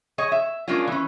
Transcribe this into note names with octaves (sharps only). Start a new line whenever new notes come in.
G#4 C#5 D#5
E5
G#3 A#3 C#4 D4 F4
E3 C#4